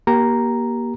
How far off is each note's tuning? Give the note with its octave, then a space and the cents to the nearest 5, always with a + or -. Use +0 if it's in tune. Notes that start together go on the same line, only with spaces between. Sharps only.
A#3 +25 G4 -15 A#5 +0